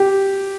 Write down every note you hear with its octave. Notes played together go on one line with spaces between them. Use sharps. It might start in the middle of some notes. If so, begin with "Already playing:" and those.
Already playing: G4